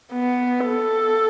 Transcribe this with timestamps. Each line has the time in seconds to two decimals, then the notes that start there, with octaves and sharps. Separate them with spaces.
0.13 B3
0.68 A4